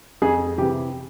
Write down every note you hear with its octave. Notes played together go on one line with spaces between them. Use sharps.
F2 G#4
C3 E3 G4